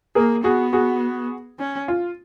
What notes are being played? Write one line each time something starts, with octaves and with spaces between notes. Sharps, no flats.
A#3 G#4 A#4
B3 F#4 G#4
F#4 G#4
C#4
F4